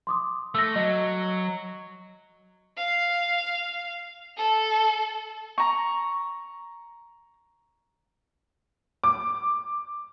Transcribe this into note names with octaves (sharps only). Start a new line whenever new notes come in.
C6 D6 D#6
A3 E6 A#6
F#3 D#5
F5
A4
A#5 C#6
D6